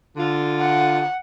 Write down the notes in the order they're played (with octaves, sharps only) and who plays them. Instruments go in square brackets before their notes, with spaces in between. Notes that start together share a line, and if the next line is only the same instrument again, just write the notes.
[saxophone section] D3 F4
[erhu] F#5